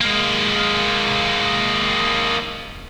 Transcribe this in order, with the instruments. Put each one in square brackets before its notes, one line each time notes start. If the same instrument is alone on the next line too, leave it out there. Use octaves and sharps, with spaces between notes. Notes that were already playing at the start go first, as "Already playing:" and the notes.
[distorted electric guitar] G#3 A#3